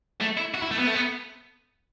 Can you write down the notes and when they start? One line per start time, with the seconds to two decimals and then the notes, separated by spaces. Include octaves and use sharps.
0.21 A3
0.37 E4
0.54 F#4
0.62 E4
0.71 A3
0.79 B3
0.87 A3
0.95 B3